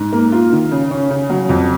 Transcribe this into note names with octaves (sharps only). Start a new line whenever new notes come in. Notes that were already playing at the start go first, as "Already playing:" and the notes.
Already playing: G#2
A#3
F4
D#3
C#3
C#4
C#3
F#3
F2